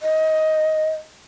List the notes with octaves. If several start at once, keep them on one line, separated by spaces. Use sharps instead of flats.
D#5